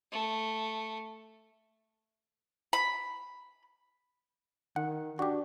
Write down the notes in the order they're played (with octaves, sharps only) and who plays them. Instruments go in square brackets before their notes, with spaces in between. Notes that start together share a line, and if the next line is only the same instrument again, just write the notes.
[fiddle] A3
[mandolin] B5
[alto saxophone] D#3 [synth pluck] F#5
[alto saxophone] D4 [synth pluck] F#4 G4